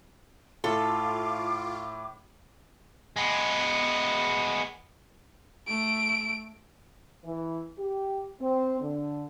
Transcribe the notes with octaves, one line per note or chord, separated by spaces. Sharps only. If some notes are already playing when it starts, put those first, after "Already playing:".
A2 F4 A4 D6
G#3 B3
A3 D7
E3
G4
C4
D3